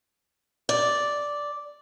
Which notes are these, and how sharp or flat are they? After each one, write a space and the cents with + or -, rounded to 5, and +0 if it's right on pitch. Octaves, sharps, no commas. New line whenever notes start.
D5 -5